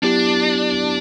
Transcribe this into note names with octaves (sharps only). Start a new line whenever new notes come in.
F#3 B3 D4 E4 G4